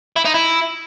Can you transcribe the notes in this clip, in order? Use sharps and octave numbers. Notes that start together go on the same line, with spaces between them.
E4
D#4
E4